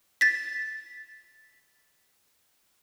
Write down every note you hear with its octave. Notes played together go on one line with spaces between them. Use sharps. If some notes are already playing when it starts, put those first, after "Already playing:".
A6 B6